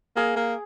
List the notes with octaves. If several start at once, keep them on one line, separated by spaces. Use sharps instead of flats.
A#3 G#4
A#3